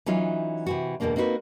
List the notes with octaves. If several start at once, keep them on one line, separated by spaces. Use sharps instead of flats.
E3 F#3 C#4 D#4 F4
C3 E3 F#4
E2 G2 B2 D3 A#3 D4
A#3 C4 D#4 F#4 B4